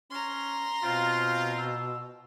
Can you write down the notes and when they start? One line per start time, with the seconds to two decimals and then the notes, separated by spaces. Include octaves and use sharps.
0.11 C#4 A#5 C6
0.83 B2 C4 F4 F5
1.58 E6